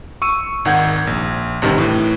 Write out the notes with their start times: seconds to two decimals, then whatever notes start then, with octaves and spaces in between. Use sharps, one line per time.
0.22 C#6 E6 D#7
0.65 G#1 D#3 F#5 G6 G#6
1.07 A#1
1.62 A1 G2 C3 D#3
1.78 A2 E3